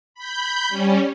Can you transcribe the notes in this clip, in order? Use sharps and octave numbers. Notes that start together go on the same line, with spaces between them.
B5 G6
G3 C#4